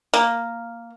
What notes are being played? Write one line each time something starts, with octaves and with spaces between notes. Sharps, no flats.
A#3